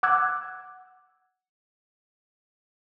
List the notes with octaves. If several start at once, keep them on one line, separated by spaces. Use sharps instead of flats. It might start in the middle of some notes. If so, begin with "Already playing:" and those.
F#5 D6 E6 F#6 G#6